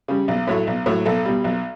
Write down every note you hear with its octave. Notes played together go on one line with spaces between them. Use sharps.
C#3 G3
B1
A2 F#3 A3
B1
A2 F#3 A3
B1 A4
B2 G3
B1